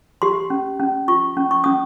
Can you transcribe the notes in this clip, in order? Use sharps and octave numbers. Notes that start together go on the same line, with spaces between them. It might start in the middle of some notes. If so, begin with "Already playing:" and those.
G4 C6
C#4
C#4
F4 C#6
C#4
C#6
C#4 D#6